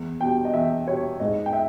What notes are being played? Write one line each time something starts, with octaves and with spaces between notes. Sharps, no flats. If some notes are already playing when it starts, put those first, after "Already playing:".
Already playing: E2
B2 G3 G5
D#5
E2 E5
B2 G3 C#5
G#2 D#5
G5
E5